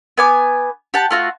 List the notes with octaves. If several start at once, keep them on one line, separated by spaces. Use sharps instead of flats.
B3 G#5 D6
G4 F#5 A5
A3 F4 F#4